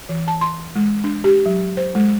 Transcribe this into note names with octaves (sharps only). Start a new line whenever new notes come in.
E3
A5
C6
G#3
D4
G4
F#3
C5
G#3